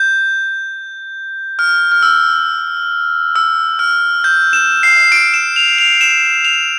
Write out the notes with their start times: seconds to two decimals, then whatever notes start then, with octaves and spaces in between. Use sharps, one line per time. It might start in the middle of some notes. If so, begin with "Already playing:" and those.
Already playing: G6
1.59 F6
1.92 F6
2.03 E6
3.36 E6
3.79 F6
4.24 G6
4.53 E7
4.83 C7
5.12 D7
5.34 E7
5.56 F7
5.79 F7
6.01 E7
6.45 F7